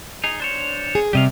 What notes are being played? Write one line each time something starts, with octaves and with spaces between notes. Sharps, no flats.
D#4 G#4
D4 C5 C#5
G#4
C3 G3 G4 D#5 F5